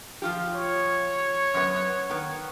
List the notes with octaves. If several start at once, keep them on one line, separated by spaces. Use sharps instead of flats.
F3 F4 G4
C#5
F#2 B3
D#3 B3